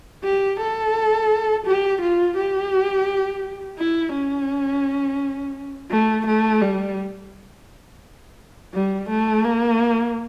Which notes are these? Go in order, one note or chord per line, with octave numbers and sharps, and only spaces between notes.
G4
A4
G4
F4
G4
E4
C#4
A3
A3
G3
G3
A3
A#3